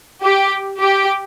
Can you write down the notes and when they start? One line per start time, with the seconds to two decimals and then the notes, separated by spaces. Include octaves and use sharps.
0.22 G4
0.81 G4